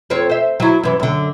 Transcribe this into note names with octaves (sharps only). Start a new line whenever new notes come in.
F2 C4 C#5
C5 E5
F#3 E4
F#2 E3
F#2 D3